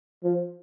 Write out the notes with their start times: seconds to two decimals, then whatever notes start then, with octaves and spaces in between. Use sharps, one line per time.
0.24 F3